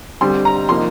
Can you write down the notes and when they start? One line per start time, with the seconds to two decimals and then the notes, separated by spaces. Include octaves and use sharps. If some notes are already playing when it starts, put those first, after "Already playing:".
0.21 D3 G3 C4 C6
0.45 A#5
0.69 F3 A#3 D#4 C6